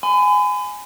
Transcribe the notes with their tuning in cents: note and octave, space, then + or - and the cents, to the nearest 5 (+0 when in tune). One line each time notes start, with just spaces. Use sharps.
G#5 +0 B5 +40